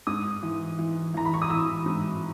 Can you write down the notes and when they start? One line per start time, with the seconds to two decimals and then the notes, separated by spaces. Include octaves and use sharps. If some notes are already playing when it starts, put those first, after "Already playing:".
0.07 G#2 D#6
0.43 E3
0.79 E3
1.14 E3 A#5
1.25 B5
1.34 C#6
1.42 D#6
1.50 E3 E6
1.86 G#2